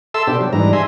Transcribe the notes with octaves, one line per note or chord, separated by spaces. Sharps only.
A4 E5 A5 C6 E6
B2 D4 G4 C5
F#3
G#2 E3 G3 D4 A#5
E5 G#5 C6